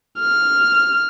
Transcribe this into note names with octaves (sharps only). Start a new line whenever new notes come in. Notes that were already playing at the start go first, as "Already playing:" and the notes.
F6